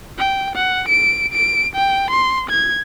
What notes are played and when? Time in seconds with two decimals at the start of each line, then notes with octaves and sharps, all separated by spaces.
0.18 G5
0.56 F#5
0.88 D7
1.33 D7
1.76 G5
2.11 C6
2.50 G#6